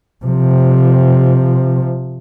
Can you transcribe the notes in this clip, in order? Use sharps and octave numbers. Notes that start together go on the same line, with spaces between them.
C3 F3